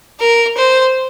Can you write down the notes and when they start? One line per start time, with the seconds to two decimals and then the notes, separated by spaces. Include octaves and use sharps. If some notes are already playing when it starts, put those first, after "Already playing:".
0.20 A#4
0.57 C5